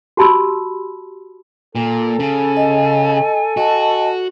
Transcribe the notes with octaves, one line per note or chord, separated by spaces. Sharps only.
F#4 G4 A5 B5 C6 E6
A#2 A4
C#3 G#5
D#5
F#4 D#5 A5